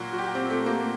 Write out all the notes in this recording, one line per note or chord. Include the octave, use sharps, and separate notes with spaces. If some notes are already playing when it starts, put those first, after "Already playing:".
Already playing: A#2 F#3 F#4
F#4
G4
C4
A3
A#3